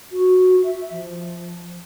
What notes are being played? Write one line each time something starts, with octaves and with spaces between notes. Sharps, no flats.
F#4
E5
F3